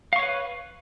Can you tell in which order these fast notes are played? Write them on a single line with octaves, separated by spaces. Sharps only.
F5 C#6 C#5 B4